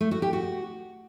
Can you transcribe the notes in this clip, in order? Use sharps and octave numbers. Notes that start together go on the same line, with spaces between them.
A3
F#4
G4
F#4